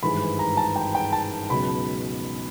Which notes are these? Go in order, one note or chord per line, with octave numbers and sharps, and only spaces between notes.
G#1 G2 E3 G#3 B5
A#5
A5
G5
G5
A5
C#2 B2 F#3 B5